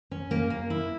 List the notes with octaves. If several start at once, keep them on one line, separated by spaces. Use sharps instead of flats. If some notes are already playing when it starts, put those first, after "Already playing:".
C#4
A#3
A#3
E4